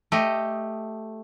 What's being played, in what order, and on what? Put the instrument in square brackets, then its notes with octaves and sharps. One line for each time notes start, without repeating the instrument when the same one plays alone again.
[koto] A3 G4 D#5